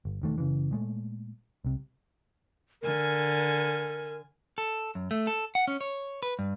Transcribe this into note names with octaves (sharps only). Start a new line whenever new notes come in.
G1
E1 D#3 A3
F#1 C#3 E3
A#2 G#3 A3
C2 C3
D3 A#4 G#5
A4
F#2
A3
A4
F#5
C#4
C#5
B4
G2